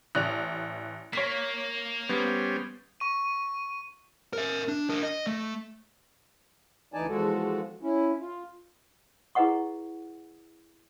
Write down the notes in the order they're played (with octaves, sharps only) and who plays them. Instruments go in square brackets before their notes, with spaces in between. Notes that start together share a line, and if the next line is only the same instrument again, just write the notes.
[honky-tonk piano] A1 D5 F7 [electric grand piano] F#6
[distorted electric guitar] A#3 [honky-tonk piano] C#5 B6
[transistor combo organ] G3 C#4 C5 [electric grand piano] B3
[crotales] C#6 D#7
[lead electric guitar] A#4 E5
D4
D4 A#4
D#5
A3
[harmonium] D2 E3 D#4 D5 G#5 A5
E2 F3 G#3 F#4 A4
C#4 E4
F4
[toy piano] E4 G#4 B4 D#5 F#5 C#6